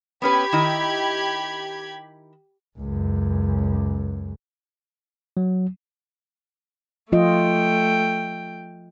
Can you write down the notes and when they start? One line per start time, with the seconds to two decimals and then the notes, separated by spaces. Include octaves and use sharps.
0.22 B3 C#4 G4 B4 B5 G#6
0.52 D#3 E4 D#5
2.79 C#2 F#2
5.37 F#3
7.12 F3 A3 F4 D#5 G5